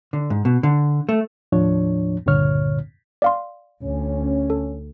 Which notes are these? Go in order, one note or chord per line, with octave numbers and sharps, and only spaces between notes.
D3
G#2
B2
D3
A3
D#2 A2 F3 D4 C#5
C#2 G2 A#2 D3 C#5 F6
D5 F5 C6
D2 C#4
A4